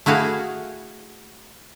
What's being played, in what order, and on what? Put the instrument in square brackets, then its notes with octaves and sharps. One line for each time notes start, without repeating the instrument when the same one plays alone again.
[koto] A3 E4 F#4 G#4 F5